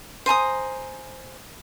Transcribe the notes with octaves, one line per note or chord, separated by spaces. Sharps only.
C5 G#5 A#5 D#6